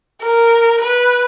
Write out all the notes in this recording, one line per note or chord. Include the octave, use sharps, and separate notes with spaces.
A#4
B4